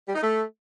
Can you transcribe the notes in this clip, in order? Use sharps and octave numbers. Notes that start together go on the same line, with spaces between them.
G3
D#4
A3